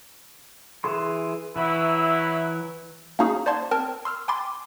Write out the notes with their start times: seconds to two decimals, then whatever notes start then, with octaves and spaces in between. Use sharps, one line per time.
0.84 E3 G#4 C6
1.56 E3 F#3 E4
3.19 A#3 C#4 D#4 F#4 G#4
3.46 C5 D5 F#5 A5 C6 G#6
3.71 C4 A#4 A5
4.05 C6 E6 F6
4.28 G5 G#5 B5 C6 D6 A6